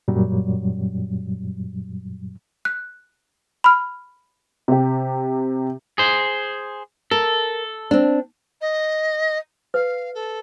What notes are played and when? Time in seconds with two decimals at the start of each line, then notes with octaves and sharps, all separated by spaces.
0.08 F#2 A#2 F#3 G3
2.65 F#6
3.64 B5 F6
4.68 C3 G4
5.98 G#4 C5
7.11 A4 A#4
7.91 C4 D4
8.61 D#5
9.74 B4 F5
10.14 A4